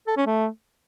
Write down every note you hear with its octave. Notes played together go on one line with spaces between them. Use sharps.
A4
C#4
A3